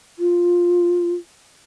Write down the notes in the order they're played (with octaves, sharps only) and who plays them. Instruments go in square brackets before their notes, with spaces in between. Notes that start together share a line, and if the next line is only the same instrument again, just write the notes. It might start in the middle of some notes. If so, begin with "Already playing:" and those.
[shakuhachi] F4